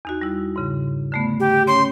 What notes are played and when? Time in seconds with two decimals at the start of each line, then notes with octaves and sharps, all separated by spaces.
0.05 E2 D#4 F#4
0.21 G3 E4
0.56 G#2 C#3
1.12 D3 A3 B3
1.40 G4
1.67 C#4 G4 C#5 C6